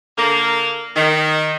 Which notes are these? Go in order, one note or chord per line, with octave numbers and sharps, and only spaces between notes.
D3 A#3
D#3